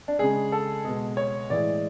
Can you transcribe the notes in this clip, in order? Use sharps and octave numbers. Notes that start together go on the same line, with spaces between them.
D4
C#3 G#3 G#4
A4
B2 G#3
C#5
A2 E3 G#3 D5